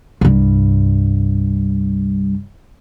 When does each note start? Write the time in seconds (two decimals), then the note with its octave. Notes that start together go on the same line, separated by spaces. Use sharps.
0.21 C2 G2